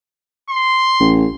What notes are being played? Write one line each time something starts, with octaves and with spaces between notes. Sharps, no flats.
C6
A1